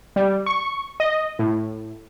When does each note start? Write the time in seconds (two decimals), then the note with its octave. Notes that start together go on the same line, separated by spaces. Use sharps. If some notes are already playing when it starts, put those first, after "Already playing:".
0.16 G3
0.46 C#6
1.00 D#5
1.39 A2